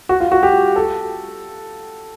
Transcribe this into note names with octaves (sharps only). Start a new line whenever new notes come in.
F#4
F4
F#4
G4
A4